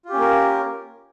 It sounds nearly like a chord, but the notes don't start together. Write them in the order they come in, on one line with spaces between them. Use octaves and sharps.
F4 G4 C#4 A#3 A#4